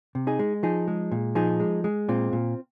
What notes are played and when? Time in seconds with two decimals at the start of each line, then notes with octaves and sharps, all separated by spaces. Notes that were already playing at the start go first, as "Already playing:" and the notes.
0.15 C3
0.27 D#4 G#4
0.39 G#3
0.63 F3 D#4 G#4
0.88 G#3
1.11 A#2
1.35 F3 D#4 G#4
1.60 G#3
1.84 G#3
2.08 A#2 C4 F4
2.33 A#2